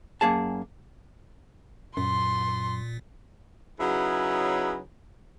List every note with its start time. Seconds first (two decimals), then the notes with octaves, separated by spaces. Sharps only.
0.21 F#2 A#3 G#4 A5
1.97 F#2 A#2 C6
3.80 C#3 F#3 D#4 E4 G#4 B4